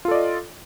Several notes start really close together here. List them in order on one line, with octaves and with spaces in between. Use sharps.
F4 A4 D5 D#5